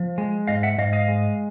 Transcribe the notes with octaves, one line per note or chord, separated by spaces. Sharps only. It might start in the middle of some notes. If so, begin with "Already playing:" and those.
Already playing: F3
G#3
G#2 D#5 F5
E5 F#5
G#2 D#5 F5
D#5 F5
G#3